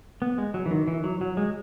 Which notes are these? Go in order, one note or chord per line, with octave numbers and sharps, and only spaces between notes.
B3
G#3
F#3
E3
D#3
E3
F#3
F#3
G#3